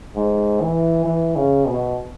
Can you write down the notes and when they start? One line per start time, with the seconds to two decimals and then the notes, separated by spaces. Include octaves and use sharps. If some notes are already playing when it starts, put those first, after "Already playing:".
0.16 G#2
0.61 E3
1.05 E3
1.36 C#3
1.66 B2